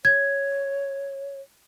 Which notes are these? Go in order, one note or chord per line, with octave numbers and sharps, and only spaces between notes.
C#5 G#6